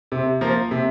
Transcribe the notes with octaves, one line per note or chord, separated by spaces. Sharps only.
C3
F3 A#3
C3